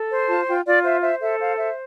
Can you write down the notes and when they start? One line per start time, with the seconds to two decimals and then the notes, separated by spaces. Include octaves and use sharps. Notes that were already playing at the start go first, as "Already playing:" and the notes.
Already playing: A4
0.10 C5
0.27 F4 A5
0.46 F4 G5
0.65 F4 D5
0.84 C5 E5
1.02 C5 E5
1.22 A4 E5
1.40 C5 F5
1.58 C5 E5